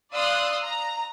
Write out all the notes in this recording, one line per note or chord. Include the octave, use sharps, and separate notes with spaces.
D5 F5 C6 D#6 E6 F#6
A#5